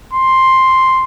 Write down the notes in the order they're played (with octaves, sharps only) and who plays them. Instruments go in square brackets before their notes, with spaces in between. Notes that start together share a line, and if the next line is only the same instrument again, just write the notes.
[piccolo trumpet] C6